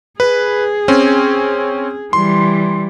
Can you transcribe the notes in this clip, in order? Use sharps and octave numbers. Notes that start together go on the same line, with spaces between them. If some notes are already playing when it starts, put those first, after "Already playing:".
G#4 B4
C4 C#4
E3 G3 C6